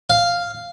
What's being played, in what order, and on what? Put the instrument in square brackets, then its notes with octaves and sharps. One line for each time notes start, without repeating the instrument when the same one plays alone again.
[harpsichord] F5